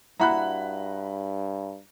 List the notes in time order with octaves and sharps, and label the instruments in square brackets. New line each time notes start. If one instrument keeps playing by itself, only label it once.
[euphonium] G2 [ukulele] E4 F#4 F#5 [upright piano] A#5 B5 F#6